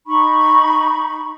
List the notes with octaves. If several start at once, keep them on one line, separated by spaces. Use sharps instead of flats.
D#4 B5 C#6